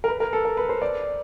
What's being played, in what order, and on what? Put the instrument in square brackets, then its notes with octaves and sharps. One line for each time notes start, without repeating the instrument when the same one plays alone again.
[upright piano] A#4
B4
A#4
A4
A#4
B4
C5
D5